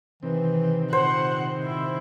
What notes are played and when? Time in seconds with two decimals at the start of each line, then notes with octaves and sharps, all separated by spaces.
0.23 C3 D#3 E3 C4
0.93 A#2 C5 F#5
1.64 A#2 E4